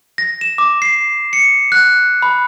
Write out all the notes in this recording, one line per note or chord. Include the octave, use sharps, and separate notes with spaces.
A#6
E7
D6
C7
C#7
F#6
B5